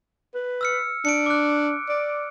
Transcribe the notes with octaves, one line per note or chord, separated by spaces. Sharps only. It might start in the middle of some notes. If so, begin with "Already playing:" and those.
B4
E6 F6 C#7
D4 C#7 D7
D6 F#6
D5